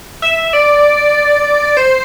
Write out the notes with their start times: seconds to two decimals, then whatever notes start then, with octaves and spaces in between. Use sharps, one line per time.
0.22 E5
0.53 D5
1.77 C5